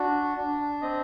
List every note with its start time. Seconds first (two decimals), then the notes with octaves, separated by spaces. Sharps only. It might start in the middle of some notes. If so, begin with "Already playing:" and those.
Already playing: D4 F#4
0.37 D4
0.82 C4 D#5